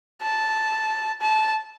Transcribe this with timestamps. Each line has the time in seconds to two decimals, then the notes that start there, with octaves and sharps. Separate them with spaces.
0.22 A5
1.21 A5